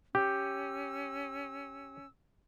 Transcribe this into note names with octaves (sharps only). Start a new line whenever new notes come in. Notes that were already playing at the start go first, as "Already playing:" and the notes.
C#4 G4 E6